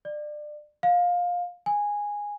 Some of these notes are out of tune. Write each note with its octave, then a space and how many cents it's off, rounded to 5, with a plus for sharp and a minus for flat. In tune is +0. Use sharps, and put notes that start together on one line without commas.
D5 +25
F5 +20
G#5 -10